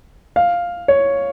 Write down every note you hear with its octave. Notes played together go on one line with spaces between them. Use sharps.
F5
C#5